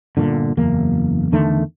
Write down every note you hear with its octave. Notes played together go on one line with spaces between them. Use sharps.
G1 C2 A#2 D3
F#1 E2 A#3
E2 D3 D#3 A3